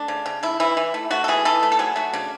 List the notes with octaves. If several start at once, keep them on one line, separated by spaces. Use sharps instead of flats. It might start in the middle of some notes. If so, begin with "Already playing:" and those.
Already playing: A3 D4
C#3
C#3
A3 E4
E3 E4
E3
A3
A3 F#4
A4
E3 G#4
E3 A4
A3
A4
F#3 G#4
A3 F#4
C#3 D4